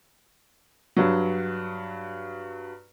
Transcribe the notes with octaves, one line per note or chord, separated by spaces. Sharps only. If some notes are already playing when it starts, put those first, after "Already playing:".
G2 F#3